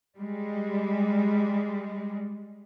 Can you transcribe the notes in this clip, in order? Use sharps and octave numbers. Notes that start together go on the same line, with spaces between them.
G3 G#3